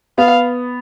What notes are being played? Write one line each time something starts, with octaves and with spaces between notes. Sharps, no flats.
B3 F5